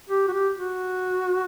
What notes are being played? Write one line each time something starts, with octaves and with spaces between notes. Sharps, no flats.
G4
F#4
G4
F#4